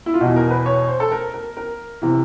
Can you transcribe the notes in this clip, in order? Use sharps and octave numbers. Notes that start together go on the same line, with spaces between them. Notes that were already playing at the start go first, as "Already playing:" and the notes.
E4
F4
E2 B2 F#4
A#4
B4
C#5
C5
A4
A#4
A#4
A#4
C3 E3